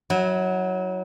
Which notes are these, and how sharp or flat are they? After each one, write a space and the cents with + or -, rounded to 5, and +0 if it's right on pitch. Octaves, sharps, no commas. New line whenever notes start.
F#3 +0 E4 -45